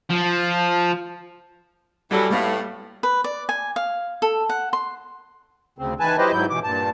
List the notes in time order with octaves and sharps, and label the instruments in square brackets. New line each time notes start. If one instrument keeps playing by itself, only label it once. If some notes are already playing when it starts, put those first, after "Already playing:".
[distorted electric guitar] F3
[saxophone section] E3 F#3 [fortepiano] G3 A4
[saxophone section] A2 [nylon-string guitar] A#3 B3 F5
[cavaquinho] B4
D5
G#5
F5
A4
F#5
C6
[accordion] D2 C#3 C4
D#3 E3 B4 G#5 A5
F#3 E4 G4 B4 C5 D#5
G#2 F#3 E4 G6
B2 E3 D6
G2 A#2 A5